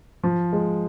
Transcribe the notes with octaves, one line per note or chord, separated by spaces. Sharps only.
F3
G#3